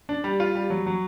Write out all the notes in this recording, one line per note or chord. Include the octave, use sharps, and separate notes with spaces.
D4
G3
F4
G3
F#3
F#3